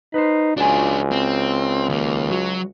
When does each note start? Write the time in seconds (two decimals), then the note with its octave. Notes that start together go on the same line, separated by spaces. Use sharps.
0.14 D#4 B4 C5
0.57 C#2 D4 F4 F#4 G#5
1.12 C4
1.89 D#2 A#3
2.31 F#3 F#4